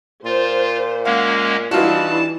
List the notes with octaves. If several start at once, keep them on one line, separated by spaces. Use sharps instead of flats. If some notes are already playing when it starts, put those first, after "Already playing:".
A#2 F4 C5
G#3 A#3 C#4 F5 F#5
E3 G3 D4 D#4 F4 F#4 A5